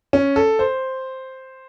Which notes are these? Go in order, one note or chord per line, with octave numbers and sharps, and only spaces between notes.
C#4
A4
C5